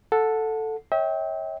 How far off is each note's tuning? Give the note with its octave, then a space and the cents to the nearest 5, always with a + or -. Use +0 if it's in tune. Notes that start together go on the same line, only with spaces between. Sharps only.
A4 +0 F#5 -25
C#5 -5 E5 -40 G5 +0